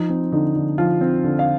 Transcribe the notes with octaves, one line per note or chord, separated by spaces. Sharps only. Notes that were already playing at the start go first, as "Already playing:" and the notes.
Already playing: F3 D#4
C4
D3 D#4
D3
F3 F4
C4
D3
F5